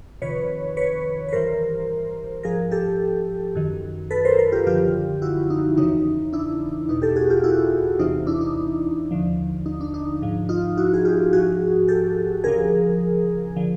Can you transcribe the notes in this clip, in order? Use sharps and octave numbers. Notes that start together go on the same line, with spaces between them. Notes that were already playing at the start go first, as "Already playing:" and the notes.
F2 C3 D#3 B4 C#5
B4 C#5
B4
G2 E3 A#4 C5
G#2 F3 G#4 A#4
G4 A4
F#2 D#3
A4 B4
A#4 C5
A#4 C5
F4 G4
F#2 D3 F3 F4 G4
E4 F#4
D#4
E2 C#3 E3 D#4
D4 E4
E2 B2 D#4
G4 A4
F#4 G#4
F4 G4
E4 F#4
E2 C3 E3 D#4 F4
D4 E4
D#4
D#2 D3 F3
D#4
D4
D#4
G#2 F3
D#4 F4
E4 F#4
G#4
F4 G4
G#2 F3 F#4 G#4
G4 A4
D2 C#3 F3 G#4 A#4
D3 F3